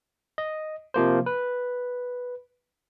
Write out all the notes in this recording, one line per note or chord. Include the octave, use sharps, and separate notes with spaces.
D#5
C3 F3 A#3 C5
B4